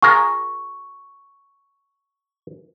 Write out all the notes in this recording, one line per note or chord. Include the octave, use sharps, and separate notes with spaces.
F4 G#4 A#4 C#6